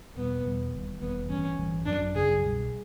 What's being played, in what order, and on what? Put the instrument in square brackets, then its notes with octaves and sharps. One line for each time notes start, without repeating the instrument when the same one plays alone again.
[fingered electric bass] E2 B2 G3 [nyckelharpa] B3
[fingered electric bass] E2 B2 G3
E1 D#2 D#3 G3
[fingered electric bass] E1 D#2 D#3 G3 [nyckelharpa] B3
[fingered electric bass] A1 G2 E3 [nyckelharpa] C#4
[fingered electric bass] A1 G2 E3
[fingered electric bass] G#1 F#2 C#3 F#3 [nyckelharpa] D4
[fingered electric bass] G#1 F#2 C#3 F#3 [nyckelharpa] G#4
[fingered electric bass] C2 B2 G3